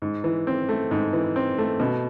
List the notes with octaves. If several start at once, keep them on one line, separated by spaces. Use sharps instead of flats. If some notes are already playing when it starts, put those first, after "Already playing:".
G#2
E3
C4
A3
G#2
E3
C4
A3
B2